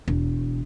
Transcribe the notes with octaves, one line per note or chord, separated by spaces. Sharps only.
E1